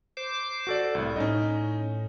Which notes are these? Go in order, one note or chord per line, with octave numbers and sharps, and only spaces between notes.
C5 D6
F#4 A4 D5
C2 A2
A2 C#4 D#4 D#5